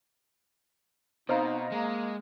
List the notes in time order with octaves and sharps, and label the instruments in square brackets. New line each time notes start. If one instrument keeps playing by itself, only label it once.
[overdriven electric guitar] B2 [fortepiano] C4 [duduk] D#4 [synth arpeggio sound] D#5 F5 A#5
[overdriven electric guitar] G#3 [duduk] A#3